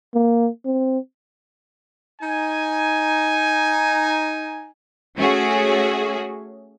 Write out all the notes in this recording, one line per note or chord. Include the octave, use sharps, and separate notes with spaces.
A#3
C4
D#4 G#5
A3 C#4 F#4 G#4